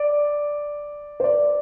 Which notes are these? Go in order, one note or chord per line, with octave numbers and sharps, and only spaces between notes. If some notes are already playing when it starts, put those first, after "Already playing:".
Already playing: D5
C5
D5